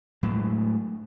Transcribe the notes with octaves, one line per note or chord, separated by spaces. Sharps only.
A2 F#3 G#3 A3